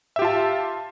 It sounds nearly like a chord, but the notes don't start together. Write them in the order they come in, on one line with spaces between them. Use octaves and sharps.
E5 G4 F4 A5